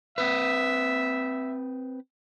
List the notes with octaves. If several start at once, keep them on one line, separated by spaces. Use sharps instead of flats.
C4 B4 E5